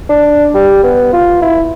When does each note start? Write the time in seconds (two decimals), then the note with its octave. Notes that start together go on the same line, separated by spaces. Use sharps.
0.10 D4
0.54 G3
0.84 B3
1.13 F4
1.42 E4